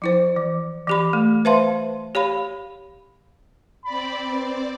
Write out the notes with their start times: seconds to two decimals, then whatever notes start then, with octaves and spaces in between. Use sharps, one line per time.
0.02 F3 E4 C5
0.36 E3
0.87 E3 G4 B5
1.13 A3
1.45 B4 C5 E5 F5 A5 C6
2.15 G4 C#5 F5 B5
3.85 C4 D5 B5
4.32 B4